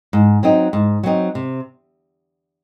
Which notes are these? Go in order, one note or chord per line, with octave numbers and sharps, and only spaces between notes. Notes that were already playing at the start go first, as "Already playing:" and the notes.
G#2
F#3 C4 D#4
G#2
F#3 C4 D#4
C3